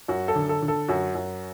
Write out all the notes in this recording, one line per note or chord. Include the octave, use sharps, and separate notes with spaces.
F#2 F#4
A4
D3
A4
D3
A4
F#2 F#4
F#2